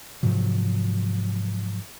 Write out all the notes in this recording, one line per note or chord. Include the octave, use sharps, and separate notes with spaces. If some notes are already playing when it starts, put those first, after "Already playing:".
G#2 C3 F3 F#3